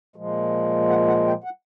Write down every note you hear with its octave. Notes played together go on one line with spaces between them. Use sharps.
A#2 F3 G#3
F#5
F#5
G5
F#5